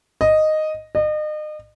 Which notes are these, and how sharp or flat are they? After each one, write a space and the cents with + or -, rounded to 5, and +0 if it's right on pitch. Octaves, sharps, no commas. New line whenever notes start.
D#5 -5
D#5 -35